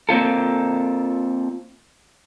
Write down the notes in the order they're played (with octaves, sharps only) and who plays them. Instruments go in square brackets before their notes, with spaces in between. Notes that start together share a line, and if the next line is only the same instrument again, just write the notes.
[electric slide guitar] A#3 C4 F4 A4